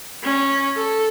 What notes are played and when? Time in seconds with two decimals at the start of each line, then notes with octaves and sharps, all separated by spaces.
0.22 C#4
0.75 A4